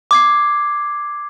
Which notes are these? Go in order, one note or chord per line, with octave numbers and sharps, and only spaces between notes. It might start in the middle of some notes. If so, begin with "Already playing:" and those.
D6 G#6 C7